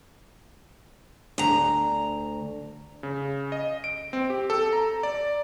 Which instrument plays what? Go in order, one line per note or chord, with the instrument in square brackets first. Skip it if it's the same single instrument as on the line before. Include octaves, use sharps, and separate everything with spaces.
[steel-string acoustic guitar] D2 A#5
[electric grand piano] C#3
D#5
D7
C4
G4
A4
A#5
D5